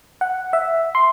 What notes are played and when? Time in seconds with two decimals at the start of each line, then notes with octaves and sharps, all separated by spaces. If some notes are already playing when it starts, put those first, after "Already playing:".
0.21 F#5
0.53 E5
0.95 C6